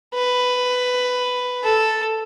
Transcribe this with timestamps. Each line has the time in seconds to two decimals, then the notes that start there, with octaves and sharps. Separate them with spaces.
0.14 B4
1.64 A4